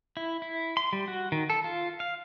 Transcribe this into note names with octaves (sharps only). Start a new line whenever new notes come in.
E4
E4
C6
G3
F#4
D#3
A4
F4
F5